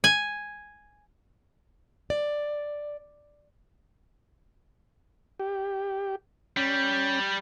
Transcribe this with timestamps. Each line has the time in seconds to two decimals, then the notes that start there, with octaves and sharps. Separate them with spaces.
0.04 G#5
2.10 D5
5.39 G4
6.57 G3 C#4